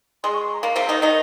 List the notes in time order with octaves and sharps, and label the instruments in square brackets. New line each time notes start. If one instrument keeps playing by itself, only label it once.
[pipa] G#3 [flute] C6
[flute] C#6
C6
A#5
[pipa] A#3 [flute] F5
[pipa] C3 C4
D#3 D#4
[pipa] D#3 D#4 [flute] D#5